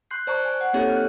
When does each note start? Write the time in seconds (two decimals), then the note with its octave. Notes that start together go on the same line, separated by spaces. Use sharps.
0.11 C6 F#6 G6 C7
0.27 C5 D5 A5 A#5 C#6 F#6
0.45 G#5
0.61 F#5
0.73 A#3 C4 D#4 G4 A4 C#5
0.90 F6 F#6